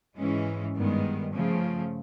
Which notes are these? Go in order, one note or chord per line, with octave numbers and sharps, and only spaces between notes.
G#2 E3 G#3 C#4
G2 D#3 G#3 B3
C#3 F3 A3